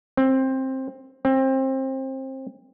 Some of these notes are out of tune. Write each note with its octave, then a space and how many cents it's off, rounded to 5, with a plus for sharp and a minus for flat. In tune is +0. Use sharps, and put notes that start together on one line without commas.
C4 +15
C4 +25